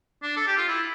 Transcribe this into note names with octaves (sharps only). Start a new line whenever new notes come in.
D4
A4
G4
F4
E4